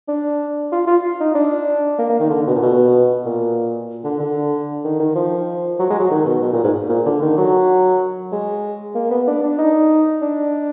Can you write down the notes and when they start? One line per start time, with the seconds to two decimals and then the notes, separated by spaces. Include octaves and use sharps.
0.08 D4
0.72 F4
0.88 F4
1.20 D#4
1.35 D4
1.98 A#3
2.10 A#3
2.20 D#3
2.30 D3
2.47 B2
2.55 A#2
2.62 B2
3.26 A#2
4.05 D3
4.20 D3
4.85 D#3
5.00 D#3
5.15 F3
5.79 F#3
5.90 G#3
5.99 F#3
6.11 D#3
6.26 B2
6.42 B2
6.53 A#2
6.64 G#2
6.89 A#2
7.06 D3
7.22 D#3
7.38 F#3
8.32 G#3
8.95 A#3
9.11 B3
9.27 D4
9.43 D4
9.59 D#4
10.22 D4